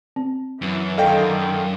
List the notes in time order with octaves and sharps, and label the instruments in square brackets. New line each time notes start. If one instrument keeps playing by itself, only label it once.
[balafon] C4
[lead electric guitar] F#2 [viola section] E3
[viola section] D3 D#3 [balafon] A4 D#5 [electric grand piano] F5 G5